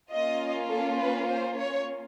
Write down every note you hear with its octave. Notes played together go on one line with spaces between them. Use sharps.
A#3 C#4 F4 D#5
A4
B4
C5
C#5